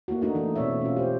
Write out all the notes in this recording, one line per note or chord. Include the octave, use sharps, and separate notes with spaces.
A3 A#3 E4 F#4
A3 D4 D#4 F#4
E3 D#4
B2 A3 C4 C#5 D5 E5
C#4 F4
G4 C5